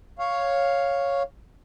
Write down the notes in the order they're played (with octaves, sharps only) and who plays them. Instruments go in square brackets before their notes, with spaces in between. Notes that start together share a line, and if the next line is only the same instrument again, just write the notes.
[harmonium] C#5 F5